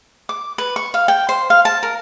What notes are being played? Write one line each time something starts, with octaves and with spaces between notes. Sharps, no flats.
D6
B4
C#6
F5
G5
C5
F5
A5
A#4